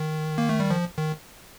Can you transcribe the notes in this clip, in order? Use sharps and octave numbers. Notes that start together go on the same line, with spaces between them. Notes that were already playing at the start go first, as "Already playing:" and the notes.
Already playing: D#3
A#3
A3
G3
F3
D#3